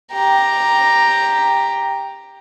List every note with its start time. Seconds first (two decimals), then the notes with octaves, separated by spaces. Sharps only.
0.12 G4 A#5